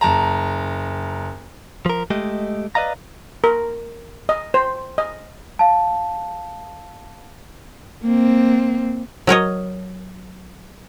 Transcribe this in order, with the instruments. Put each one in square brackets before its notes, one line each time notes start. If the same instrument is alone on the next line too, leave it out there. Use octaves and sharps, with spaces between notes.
[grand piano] F#1 A5 A#5
[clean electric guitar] F3 A#4
G#3 A3 G4 D#5
B4 D5 D#5 F5 A#5
[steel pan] A#4
D#5
C5
D#5
[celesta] F5 A5
[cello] A#3 C4
[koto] F#3 A#4 C#5 D#5